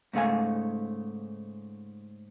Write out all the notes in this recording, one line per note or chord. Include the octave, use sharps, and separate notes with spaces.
G#2 C#3 A3 F5 G#5